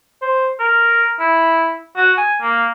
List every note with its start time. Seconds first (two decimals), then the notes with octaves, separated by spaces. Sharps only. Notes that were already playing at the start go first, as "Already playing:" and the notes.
0.22 C5
0.59 A#4
1.19 E4
1.97 F#4
2.18 G#5
2.42 A#3